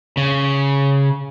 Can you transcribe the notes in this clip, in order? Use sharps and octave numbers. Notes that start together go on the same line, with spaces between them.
C#3